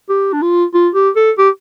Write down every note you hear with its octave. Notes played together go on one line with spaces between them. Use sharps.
G4
D4
F4
F4
G4
A4
G4